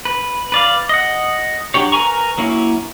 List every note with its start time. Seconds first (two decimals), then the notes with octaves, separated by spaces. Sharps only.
0.05 B4
0.52 B4 D5 F5
0.89 D#5 F#5
1.74 F#3 D4 G4 C#5
1.92 A#4 B4 G#5 A#5 C#6
2.38 F#3 A#3 C#4 E4